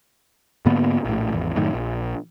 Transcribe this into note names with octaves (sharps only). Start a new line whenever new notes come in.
G#2 D3 A#3 B3
A#1 A2
G#1 E2
F#2 A2 D#3
A#1